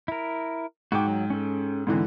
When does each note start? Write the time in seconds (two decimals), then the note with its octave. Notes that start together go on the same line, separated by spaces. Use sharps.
0.08 E4 A#4
0.92 G#2 F#4 G5 D6
1.08 F#3
1.30 C#4 A4
1.87 G#2 D3 E3 C4